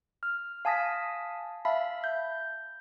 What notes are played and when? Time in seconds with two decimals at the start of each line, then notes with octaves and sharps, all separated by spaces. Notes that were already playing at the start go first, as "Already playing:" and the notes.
0.23 F6
0.65 F5 G#5 A5 D#6 A#6 B6
1.65 E5 F5 A5 B5
2.04 G6